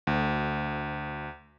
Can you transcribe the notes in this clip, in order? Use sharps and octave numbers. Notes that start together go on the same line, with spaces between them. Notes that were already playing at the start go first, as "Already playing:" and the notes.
D2